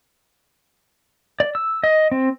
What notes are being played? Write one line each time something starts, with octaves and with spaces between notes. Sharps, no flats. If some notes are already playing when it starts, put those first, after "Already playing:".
D5
E6
D#5
C4